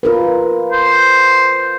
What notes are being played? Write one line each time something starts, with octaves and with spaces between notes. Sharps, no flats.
F4 A#4 B4
C5